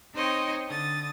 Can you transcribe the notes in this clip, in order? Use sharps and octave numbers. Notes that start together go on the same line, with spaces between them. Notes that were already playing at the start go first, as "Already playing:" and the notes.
C4 D#4 C5 C#5 D#5 G5
D3 D#6 A6